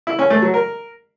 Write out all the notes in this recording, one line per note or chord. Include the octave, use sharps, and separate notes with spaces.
E4
C#4
A3
F#3
A#4